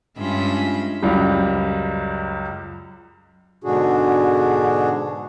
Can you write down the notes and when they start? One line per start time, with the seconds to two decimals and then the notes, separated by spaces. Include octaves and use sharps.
0.18 G2 G#3 C#4 F4 E5 B5
1.02 C#2 F#2 G3
3.64 G#2 B2 D3 D4 F#4 G#4